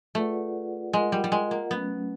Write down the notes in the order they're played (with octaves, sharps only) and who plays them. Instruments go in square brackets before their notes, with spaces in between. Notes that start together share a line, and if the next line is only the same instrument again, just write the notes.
[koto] A3 [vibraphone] F4 G#4 B4 D5 F#5
[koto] G#3 [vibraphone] F4 A#4 D#5 F#5
[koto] G3
G3
G#3
A#3
[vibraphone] F#3 A3 C#4 [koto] B3